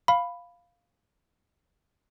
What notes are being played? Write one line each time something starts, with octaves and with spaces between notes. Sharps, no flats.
F5 B5